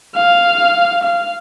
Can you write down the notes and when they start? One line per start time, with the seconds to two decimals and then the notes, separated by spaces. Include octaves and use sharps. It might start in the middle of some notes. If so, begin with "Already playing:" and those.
0.15 F5
1.04 F5